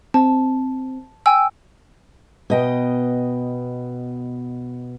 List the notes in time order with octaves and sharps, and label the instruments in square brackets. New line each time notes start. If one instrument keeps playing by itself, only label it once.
[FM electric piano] C4 [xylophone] A5
[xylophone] G5 G#5 E6
[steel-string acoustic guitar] B2 D#5 G5